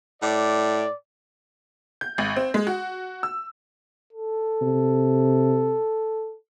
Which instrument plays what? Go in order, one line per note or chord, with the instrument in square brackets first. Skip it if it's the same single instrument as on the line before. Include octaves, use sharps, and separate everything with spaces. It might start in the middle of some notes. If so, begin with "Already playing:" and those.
[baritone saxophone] A2 [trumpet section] D5
[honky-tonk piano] G6
G#1
C4
G#3
F#4
E6
[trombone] A4
[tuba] C3